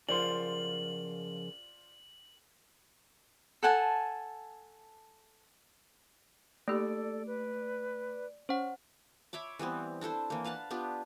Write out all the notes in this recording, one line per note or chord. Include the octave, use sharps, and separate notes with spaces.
C#3 F3 F4 A#4 C5 D5 C6 F#7
A4 F#5 G#5 A5
A3 A#3 D#4 G4 A4 D5
B4
C#4 C5 F#5
C#5 E5 B5 D6
E3 G3 B3 C4
D4 E4 A4 C5
E3 A#3
B4 F5 F#5 A5
B3 D4 F4 G4